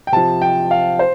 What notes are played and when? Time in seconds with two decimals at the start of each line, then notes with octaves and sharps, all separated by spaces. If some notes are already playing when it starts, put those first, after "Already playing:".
0.07 G5
0.12 C3 F3 A5
0.42 G5
0.71 F5
0.99 C5